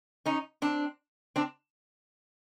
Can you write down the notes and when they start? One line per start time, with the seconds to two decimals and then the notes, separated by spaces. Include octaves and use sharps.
0.26 C#4 D#4
0.62 C4 D4
1.36 C4 D4